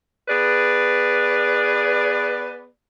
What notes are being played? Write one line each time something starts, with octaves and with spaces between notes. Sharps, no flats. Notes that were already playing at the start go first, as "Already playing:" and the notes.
B3 G#4 B4 D5